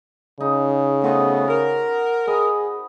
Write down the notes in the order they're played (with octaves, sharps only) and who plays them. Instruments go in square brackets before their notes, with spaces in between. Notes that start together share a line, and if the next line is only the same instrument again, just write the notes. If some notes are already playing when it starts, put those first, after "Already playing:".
[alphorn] C#3 [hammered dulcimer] D#4
[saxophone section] A3 B3 [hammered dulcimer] F#4 C5 D#5
[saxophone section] A#4
[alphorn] G#4 [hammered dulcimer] D#5 B5